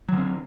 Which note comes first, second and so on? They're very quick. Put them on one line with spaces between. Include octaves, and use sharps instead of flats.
F#3 D3 C4